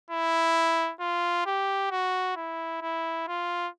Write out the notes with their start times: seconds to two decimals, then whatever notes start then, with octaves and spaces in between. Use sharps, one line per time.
0.10 E4
1.00 F4
1.46 G4
1.91 F#4
2.36 E4
2.82 E4
3.28 F4